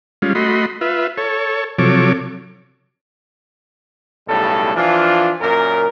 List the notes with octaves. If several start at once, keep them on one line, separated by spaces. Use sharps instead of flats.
G3 G#3 C#4 F4
A3 F#4 D#5 B5 C6
F4 B4 E5
A4 C#5
C3 F3 F#3 A4 C#5 D6
B1 A2 C#3 G3 A4
E3 F3 D4 F4
F#2 A#2 A#4